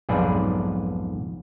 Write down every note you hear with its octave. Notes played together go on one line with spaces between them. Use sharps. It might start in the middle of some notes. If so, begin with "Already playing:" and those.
B1 F2 G#2 G#4 B4 D5